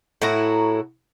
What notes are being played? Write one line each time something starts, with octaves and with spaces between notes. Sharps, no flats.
A2 E4 F#4 A#5